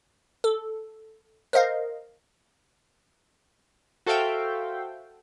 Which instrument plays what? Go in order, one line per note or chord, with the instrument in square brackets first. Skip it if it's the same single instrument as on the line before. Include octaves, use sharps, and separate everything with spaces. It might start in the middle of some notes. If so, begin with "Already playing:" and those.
[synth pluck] A4
A#4 C5 D#5 F5
[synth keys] F#4 A4 C5 E5 F5 G5